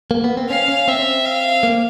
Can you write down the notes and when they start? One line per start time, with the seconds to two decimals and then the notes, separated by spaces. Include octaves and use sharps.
0.11 A#3
0.24 B3
0.37 C4
0.49 C#4 F5
0.68 C#4
0.88 C4 E5
1.26 F5
1.63 A#3